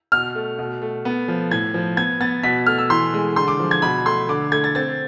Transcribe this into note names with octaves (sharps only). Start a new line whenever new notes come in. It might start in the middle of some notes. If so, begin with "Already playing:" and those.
B2 F6
A3
B2
A3
B3
F3
A2 G#6
F3
B3 G#6
B3 A6
B2 B6
A3 F6
E6
E3 C6
G#3
D3 C6
D6
F3
G#6
B2 B5
A3 C6
D3 D6
A3 G#6
A6
C4 A6